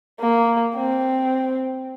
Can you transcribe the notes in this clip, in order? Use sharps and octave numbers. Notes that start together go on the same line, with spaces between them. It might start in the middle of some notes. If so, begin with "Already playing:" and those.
A#3
C4